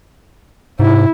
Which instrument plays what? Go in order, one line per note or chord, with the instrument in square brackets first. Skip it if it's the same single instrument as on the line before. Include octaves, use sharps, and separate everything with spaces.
[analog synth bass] G#2 [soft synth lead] C3 [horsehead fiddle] E4